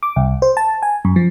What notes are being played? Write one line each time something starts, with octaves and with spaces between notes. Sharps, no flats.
D6
C2
C5
A5
G#5
F#2
F3